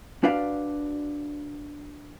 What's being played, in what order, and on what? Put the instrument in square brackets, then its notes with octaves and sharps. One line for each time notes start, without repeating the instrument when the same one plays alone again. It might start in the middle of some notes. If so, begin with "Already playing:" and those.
[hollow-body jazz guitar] D4 F#4 B4 D5 F5